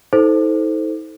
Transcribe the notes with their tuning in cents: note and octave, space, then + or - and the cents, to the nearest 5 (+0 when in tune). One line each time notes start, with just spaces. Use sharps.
D#4 +45 A4 -10 C5 -5